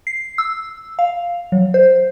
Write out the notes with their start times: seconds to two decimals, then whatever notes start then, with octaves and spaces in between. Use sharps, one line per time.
0.07 C7
0.38 E6
0.99 F5
1.52 F#3
1.74 C5